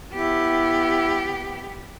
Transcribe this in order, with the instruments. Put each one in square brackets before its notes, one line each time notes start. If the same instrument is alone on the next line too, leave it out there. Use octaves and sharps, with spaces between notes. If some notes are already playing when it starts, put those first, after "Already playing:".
[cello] B3 G4 [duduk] E4